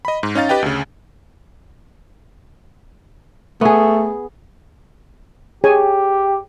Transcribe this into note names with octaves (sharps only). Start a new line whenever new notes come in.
D#5 B5
G#2
C#4 D#4 F5 A6
G4 B4 D#5 G5
D2 C#3
A3 B3 G#4
G4 G#4 C#5 G#5